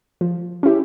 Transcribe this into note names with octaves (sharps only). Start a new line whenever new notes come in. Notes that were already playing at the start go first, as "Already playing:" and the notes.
F3
C#4 E4 G4